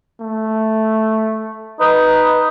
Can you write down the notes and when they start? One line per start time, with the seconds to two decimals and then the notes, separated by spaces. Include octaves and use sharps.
0.20 A3
1.80 D#4 B4